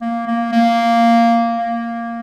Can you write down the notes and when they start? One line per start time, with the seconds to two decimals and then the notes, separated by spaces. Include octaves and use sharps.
0.01 A#3
0.28 A#3
0.53 A#3
1.57 A#3